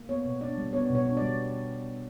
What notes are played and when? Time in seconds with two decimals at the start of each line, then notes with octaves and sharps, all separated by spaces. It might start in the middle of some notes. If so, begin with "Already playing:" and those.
Already playing: A#3
0.09 B3 C#5
0.25 B2
0.41 D4 D5
0.58 G3
0.73 B3 C#5
0.90 B2 C#5
1.06 D4
1.17 G3 D5